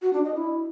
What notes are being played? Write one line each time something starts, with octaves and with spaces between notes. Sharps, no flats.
F#4
D4
D#5
E4